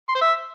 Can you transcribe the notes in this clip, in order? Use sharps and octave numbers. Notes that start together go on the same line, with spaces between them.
C6
C5
E5